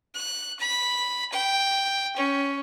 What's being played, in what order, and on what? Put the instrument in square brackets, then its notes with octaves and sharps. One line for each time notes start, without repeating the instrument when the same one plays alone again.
[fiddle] F#6
B5
G5
C#4